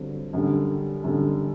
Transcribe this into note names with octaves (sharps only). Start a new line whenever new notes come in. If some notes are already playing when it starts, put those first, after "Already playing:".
Already playing: G2 D3 F#3 C4
F#2 D3 G3
F#2 D3 G3